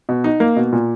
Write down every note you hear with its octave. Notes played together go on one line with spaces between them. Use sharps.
B2
D#4
A#3
B2
A#2